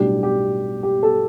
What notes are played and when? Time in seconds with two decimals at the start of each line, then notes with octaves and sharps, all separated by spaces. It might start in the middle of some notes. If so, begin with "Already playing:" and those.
Already playing: B1 A2 G3 D4 G4
0.23 G4
0.83 G4
1.03 A4